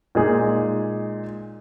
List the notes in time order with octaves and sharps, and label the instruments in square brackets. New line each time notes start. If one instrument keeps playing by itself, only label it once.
[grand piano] A#2 G#3 D#4 G#4